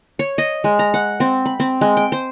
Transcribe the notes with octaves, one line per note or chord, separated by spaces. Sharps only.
C#5
D#5
G#3
A#5
F#5
C4
B5
C4
G#3
G5
C5